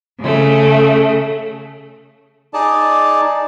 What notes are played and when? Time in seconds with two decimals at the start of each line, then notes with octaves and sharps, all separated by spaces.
0.21 C#3 A3
2.54 D#4 G#4 D5 A5